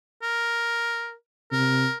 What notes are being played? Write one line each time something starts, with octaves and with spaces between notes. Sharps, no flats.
A#4
C3 A#4